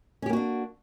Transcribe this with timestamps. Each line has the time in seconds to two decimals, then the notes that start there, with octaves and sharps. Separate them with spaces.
0.22 C#4
0.26 G4
0.29 A#3
0.33 F#4
0.36 D4